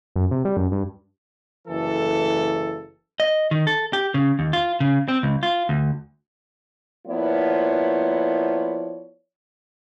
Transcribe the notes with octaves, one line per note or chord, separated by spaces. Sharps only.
F#2
C3
G3
F#2
G2
F#1 E3 A4
D#5
D#3
A4
G4
C#3
D#2
F4
C#3
C4
C#2
F4
D2
F3 A#3 B3 E4 C#5 D5